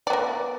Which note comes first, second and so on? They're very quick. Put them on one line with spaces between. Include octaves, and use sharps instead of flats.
D5 B3 A#4